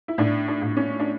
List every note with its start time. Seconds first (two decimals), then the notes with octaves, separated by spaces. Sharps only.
0.08 E4
0.18 A2 D4
0.48 D4
0.62 A2
0.77 C#4
1.00 D4